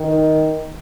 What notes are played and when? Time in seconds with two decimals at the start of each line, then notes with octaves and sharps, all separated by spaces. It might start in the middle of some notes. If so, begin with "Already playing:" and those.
Already playing: D#3